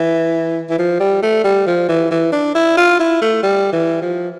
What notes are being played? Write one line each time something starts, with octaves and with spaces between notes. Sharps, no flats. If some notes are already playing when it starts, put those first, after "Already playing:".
Already playing: E3
E3
F3
G3
A3
G3
F3
E3
E3
D4
E4
F4
E4
A3
G3
E3
F3